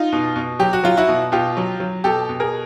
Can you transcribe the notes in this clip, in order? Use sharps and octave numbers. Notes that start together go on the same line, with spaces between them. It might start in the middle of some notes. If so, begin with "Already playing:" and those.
Already playing: D#4 F4
B2
B2
F#3 G4
F#4
F#3 F4
E4 F#4
B2
B2 F4 G4
F#3
F#3
B2 G4 A4
B2
G#4 A#4